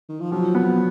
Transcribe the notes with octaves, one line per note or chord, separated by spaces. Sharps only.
D#3
F3
F3 F#3
B3